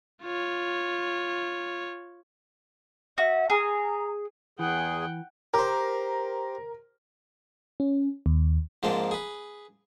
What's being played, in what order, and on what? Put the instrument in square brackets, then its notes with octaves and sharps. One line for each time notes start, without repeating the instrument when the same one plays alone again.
[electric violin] F4 C#5
[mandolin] F#4 [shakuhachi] E5
[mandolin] G#4 [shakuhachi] A#5
[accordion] E2 G#4 [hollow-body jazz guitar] E3 [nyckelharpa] F#5 G5
[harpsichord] G4 C5 [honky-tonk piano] A#4
[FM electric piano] C#4
D#2
[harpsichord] G#2 F3 G#3 A#3 C4 D4
G#4 B4